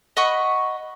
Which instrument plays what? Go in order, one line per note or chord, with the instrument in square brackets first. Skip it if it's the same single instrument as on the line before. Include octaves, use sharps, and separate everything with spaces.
[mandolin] D#5 F#5 B5 C#6